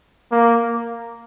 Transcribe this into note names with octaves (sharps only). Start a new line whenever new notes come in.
A#3